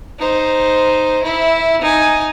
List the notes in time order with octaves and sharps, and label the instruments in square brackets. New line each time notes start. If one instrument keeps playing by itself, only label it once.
[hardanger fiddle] D#4 C5
E4 E5
D#4 G#5